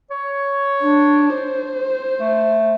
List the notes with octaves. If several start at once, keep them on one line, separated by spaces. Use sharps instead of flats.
C#5
D4
C5
A3